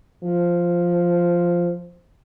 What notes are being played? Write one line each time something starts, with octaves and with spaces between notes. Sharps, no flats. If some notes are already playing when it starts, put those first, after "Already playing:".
F3